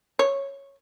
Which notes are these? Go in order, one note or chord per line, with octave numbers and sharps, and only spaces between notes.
C#5